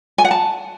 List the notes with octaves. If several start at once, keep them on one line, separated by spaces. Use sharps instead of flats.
G#5
F#5
A5